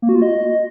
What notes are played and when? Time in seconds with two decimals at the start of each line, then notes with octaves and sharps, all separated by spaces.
0.02 A#3
0.09 F#4
0.15 F4
0.22 D#5